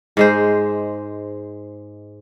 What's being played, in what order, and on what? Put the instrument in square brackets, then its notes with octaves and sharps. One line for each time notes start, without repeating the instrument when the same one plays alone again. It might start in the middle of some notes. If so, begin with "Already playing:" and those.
[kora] G#2 G#3 C5